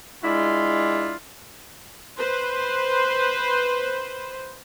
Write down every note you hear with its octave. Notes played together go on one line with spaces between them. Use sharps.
G#3 D4 E4 F4
B4 C5